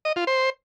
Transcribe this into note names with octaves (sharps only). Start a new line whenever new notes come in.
D#5
F4
C5